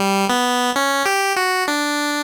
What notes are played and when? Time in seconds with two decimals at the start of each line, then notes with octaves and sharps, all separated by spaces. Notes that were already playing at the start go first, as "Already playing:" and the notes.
Already playing: G3
0.29 B3
0.76 C#4
1.06 G4
1.36 F#4
1.68 D4